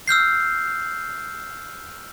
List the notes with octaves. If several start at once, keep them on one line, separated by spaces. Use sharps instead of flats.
E6 F6 G6 C7